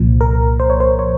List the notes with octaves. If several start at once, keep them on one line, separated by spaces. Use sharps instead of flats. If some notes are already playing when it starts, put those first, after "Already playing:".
Already playing: C2 A#2 F3
A#4
C5
C#5
C5
C#5